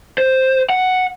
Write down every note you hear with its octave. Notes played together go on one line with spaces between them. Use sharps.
C5
F#5